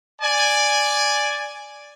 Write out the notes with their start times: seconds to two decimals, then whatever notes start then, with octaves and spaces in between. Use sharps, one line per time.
0.22 D5 G#5